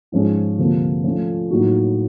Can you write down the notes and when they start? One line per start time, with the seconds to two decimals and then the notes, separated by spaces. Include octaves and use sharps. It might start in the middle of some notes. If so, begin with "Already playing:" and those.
0.12 G#2 F3 G#3 C#4
0.58 D2 C3 F3 A#3
1.04 F3 A3 C#4 F4
1.51 A2 F#3 A#3 D#4 F#4